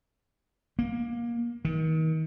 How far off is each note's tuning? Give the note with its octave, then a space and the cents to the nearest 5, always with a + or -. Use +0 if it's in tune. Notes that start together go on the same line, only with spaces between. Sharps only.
A#3 +20
D#3 +35